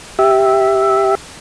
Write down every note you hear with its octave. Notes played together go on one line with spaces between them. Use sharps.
G4 E5